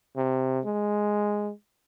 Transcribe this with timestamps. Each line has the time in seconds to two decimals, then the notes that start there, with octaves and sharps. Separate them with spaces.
0.17 C3
0.65 G#3